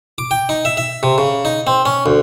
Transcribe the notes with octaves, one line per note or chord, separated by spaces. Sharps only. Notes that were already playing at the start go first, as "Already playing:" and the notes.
D6
G5
D#4
E5
E5
C3
C#3
D#4
C4
C#4
D2